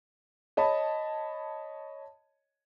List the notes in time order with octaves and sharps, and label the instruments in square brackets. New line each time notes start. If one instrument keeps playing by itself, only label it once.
[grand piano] C#5 D#5 A5 B5